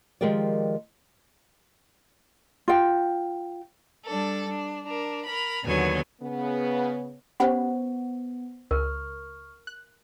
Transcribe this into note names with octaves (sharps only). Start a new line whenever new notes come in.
D#3 F3 G#3 G4 A#4 D5
F4 G5
G3 D4 A4
D4
D4 A#4
A#4 B5
D#2 D3 F#3 B3 G#5
C#3 B3
B3 C#4 G4 C5 F#5 B5
C#2 A#4 C#6 F6
F#6